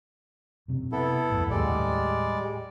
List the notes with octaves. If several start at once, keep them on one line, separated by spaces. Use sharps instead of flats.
F#2 C3
B3 E4 A4
F2 A2 A3
D#2 A2 D#3 G3 G#3 D5